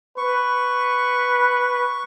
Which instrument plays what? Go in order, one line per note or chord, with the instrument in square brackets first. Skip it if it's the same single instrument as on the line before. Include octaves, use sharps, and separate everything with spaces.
[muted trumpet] B4 [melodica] C#6